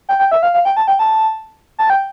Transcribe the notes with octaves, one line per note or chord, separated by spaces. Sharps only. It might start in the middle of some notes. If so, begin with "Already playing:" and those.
G5
G5
E5
F5
F5
G5
A5
G5
A5
A5
G5